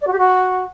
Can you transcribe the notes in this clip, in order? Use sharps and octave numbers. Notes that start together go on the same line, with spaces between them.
D5
F#4
G4
F#4